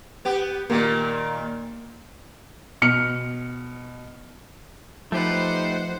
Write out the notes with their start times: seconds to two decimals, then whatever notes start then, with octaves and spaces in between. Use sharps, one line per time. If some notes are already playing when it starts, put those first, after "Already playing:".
0.25 B3 G4
0.70 A#2 D#3 A#3
2.82 B2 F6 C#7
5.12 F3 A3 D#4 G4 B4 C5 F#5